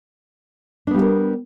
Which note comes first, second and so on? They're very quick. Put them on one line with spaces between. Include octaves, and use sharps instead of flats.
D4 B3 G3 F#4 A#4